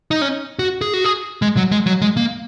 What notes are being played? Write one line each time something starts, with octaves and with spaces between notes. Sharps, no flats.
D#4
C#4
F#4
G#4
F#4
G#4
G#3
F#3
G#3
F#3
G#3
A#3